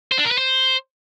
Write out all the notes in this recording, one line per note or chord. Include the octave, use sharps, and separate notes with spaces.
C5
D4
A#4
B4
C5